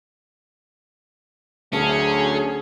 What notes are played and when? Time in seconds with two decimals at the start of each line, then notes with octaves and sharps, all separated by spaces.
1.73 D2 F#3 C#4 G#4 F5 A5 E6